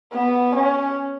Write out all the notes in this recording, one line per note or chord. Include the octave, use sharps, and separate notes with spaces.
B3
C#4